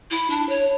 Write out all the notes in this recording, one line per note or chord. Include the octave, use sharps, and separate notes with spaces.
E4
D4
C#5